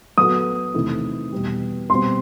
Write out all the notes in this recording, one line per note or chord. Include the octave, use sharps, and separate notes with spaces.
F#3 B3 F#4 A4 D#6
E2 C3 D#3 A3 E4
E2 B2 G3
B2 G3 C4 C6